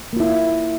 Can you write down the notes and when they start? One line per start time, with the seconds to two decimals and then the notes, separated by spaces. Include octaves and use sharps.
0.13 A#3
0.16 F4
0.20 E4